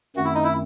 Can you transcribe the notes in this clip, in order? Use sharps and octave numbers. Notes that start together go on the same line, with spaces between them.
F#2 D#3 A3 C4 F#4
E4
D#4
E4